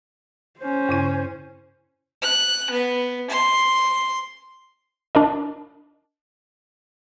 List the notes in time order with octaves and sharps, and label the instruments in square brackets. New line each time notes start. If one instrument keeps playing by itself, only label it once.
[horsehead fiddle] C#4 C5
[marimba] G2 C#3 E4
[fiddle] F#6
B3
C6
[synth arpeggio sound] D4 A#4 D#5